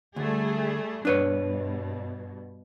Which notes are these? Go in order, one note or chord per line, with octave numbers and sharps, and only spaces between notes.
D2 G3 A3 G#4
G2 B2 D4 B4 C#5